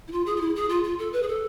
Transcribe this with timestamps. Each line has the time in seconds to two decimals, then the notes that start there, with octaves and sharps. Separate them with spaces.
0.08 E4
0.12 F4
0.26 G#4
0.36 F4
0.41 E4
0.56 G#4
0.69 F4
0.84 F4
0.99 A4
1.13 B4
1.23 G#4
1.28 A4